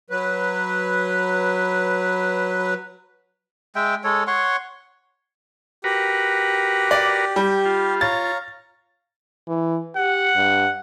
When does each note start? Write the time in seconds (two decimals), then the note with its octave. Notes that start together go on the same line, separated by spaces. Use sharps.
0.10 F#3 B4
3.76 G#3 E5 G5
4.04 G#3 A4 C#5
4.27 C#5 F#5 C6 C#6
5.84 F#4 G4 A#4 B4
6.91 D5
7.36 G3
7.65 F4
8.01 C#5 F5 A#5 A6
9.48 E3
9.96 G4 F#5
10.36 G2